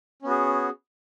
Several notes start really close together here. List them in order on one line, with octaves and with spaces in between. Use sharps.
C#4 B3 F#4 G#4